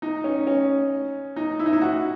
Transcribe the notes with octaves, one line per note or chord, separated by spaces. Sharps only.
D#4
C#4
C#4
D#4
E4
D#4
E4
F#4